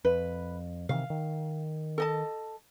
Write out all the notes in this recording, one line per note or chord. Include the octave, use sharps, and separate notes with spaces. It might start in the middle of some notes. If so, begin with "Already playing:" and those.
F2 B4
C3 D#3 E3 F5
D#3
A4 D#5 A5